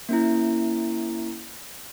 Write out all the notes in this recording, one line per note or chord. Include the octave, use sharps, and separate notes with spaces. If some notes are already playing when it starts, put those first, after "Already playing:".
A#3 C#4 E4